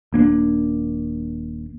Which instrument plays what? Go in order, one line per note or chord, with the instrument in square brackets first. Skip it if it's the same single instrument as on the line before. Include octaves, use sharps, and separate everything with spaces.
[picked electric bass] D#1 A#3 C4 D4